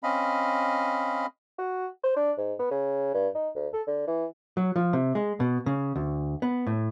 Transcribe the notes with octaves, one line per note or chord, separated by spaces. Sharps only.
C4 C#4 D#5 F5 B5
F#4
C5
D4
G#2
B3
C#3
G2
D#4
D2
A4
D3
E3
F#3
F3
C3
G#3
B2
C#3
D2
B3
A2